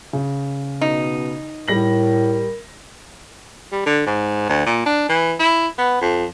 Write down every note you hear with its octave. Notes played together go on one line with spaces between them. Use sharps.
C#3
B2 D#4
A2 G3 A#4 A#6 F#7
G3
D3
G#2
D2
A#2
D4
E3
E4
B3
F2